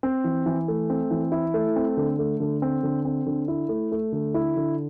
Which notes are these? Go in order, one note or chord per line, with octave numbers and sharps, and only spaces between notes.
C4
E3
E3
A3
C4
E3
E4
A3
C4
D3
A3
D3
C4
D3
C4
D3
E4
A3
A3
D3
E4
D3